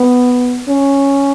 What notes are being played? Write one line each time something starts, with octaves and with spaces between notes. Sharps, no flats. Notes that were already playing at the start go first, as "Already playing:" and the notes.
Already playing: B3
C#4